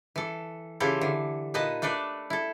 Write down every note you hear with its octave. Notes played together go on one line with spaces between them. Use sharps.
E3 A4
C#3 E3 E4 F4 G4 A4
D3 E3
A#2 D#4 B4 D#5 A5
A3 D4 A4 B4 D5
E4 A4